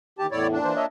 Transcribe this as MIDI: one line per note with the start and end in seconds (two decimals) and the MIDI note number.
0.19 0.27 39
0.19 0.27 67
0.19 0.27 81
0.31 0.58 40
0.31 0.58 45
0.31 0.47 64
0.31 0.47 73
0.31 0.47 74
0.52 0.86 46
0.52 0.86 62
0.64 0.73 52
0.64 0.73 72
0.76 0.84 73
0.76 0.84 75
0.76 0.84 76